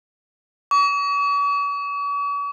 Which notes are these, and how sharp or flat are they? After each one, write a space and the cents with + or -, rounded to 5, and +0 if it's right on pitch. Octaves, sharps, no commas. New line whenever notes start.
C#6 +45